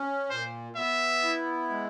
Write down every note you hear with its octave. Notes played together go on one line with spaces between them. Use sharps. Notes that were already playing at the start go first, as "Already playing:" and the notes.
Already playing: C#4
A#2 C5
B3 E5
E4
G#3